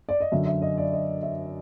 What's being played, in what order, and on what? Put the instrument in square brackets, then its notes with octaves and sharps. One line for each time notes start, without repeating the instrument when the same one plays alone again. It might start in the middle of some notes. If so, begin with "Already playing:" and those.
[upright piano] D5
D#5
F#2 D3 E5
E5
D#5
D5
D#5
E5